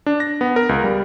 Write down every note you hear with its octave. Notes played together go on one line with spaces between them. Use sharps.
D4
A#6
B3
A#4
C#2
G3